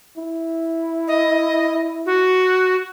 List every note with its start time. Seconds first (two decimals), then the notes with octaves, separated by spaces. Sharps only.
0.17 E4
1.08 D#5
2.06 F#4